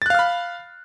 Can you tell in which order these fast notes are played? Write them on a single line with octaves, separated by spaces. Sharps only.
A6 F#6 F5 F6 B5